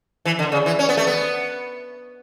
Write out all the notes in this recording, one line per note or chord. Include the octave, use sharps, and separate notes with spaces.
E3
D3
C#3
E3
C#4
B3
A3
B3